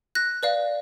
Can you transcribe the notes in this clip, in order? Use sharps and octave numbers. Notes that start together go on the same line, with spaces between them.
F#6 A#6
B4 D5 F5